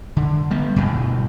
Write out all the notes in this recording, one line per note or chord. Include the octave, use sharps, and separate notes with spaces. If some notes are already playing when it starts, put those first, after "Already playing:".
D3
G3 B3
D2 G2 B2